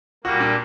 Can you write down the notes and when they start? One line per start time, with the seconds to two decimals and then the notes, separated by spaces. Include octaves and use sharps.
0.24 A#2 G3 A#3 F#4
0.40 D4